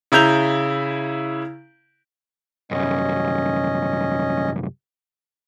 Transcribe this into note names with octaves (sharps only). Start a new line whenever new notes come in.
C#3 E4 A#5 G6 F7 G7
C2 F#2 C#4 D#5